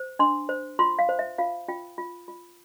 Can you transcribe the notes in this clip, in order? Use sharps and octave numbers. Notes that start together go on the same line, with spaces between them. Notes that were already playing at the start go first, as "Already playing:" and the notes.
Already playing: C5
D4 C6
C5
F4 C6
F5
C5
E5
F4 F5
F4 G5
F4
F4